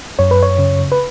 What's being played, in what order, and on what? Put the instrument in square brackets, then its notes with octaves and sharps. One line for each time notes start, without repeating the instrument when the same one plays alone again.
[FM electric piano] F#2 C#5
B4
C#5
C#3
B4